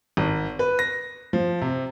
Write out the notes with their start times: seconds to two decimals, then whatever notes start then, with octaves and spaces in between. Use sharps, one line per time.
0.17 G#1
0.59 B4
0.79 A#6
1.33 F3
1.61 C3